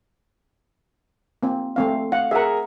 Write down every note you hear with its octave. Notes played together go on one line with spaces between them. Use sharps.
A#3 C4
A3 C4 F5
F5 F#5
G#4 A#4 E5 F#5